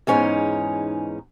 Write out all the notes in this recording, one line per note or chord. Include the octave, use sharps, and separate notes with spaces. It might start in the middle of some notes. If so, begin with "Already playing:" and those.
E2 G#2 C#4 D#4